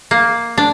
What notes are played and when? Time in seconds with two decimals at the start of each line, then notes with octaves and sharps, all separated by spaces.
0.11 A#3
0.58 D4